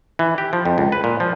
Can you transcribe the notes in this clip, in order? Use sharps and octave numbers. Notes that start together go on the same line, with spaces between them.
E3
G4
F3
F2
C#2
B4
A#2
F3